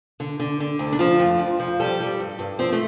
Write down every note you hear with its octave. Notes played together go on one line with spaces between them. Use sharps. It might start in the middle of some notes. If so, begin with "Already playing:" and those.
D3
D3
D3
D2
D4
F3 F4
F2
F2
F3
G3 A4
G3
G2
G2
F3 C4
A3